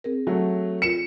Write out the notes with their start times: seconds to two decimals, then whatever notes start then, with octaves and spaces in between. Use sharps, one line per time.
0.04 C4 G#4 A#4
0.27 F#3 A3
0.82 F4 A#4 C#7 E7